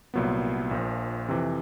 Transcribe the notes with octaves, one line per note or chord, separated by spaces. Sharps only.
C2 A#2 F#3 B3
A#1 A#2 F3
F2 C3 E3